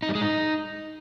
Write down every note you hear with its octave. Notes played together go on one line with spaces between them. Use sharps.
D#4
G3
G#3
D#4